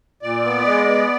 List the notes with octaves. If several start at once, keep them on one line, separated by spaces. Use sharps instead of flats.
A#2 D5
B3
G#3
B3